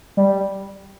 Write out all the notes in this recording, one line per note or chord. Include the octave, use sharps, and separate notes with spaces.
G3